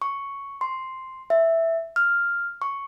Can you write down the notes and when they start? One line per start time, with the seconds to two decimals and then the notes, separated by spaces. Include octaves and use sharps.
0.02 C#6
0.61 C6
1.30 E5
1.96 F6
2.62 C#6